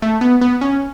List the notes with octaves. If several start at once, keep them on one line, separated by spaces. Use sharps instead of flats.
A3
B3
B3
C#4